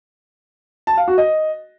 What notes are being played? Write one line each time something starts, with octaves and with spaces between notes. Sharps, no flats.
A5
F5
F#4
D#5